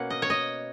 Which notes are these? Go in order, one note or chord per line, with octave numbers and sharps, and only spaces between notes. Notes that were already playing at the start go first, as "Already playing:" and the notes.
Already playing: B2 A#3 C#4 F#5
D#5
C#5
D#5